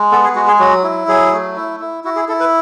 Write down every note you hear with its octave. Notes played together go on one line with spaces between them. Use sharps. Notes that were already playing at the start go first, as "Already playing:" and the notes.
Already playing: G#3
B3 A4
G#4
G#3 F#4
G#4
F#3 F#4
E4
F#3 G#4
A3
E4
E4
E4 F#4
G#4
E4 A4
B4